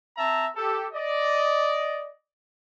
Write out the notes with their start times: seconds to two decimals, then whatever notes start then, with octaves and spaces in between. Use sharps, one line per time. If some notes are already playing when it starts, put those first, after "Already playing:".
0.17 C4 E5 A5 A#5
0.56 G4 A4
0.93 D5 D#5